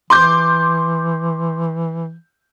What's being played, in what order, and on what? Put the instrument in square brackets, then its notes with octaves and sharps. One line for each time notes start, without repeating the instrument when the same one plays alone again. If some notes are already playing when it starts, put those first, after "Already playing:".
[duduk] E3 [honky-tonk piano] C6 D6 G6